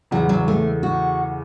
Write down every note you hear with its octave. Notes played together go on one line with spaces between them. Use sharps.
E2 C#3 E3 F#3
F#3
A3
F#4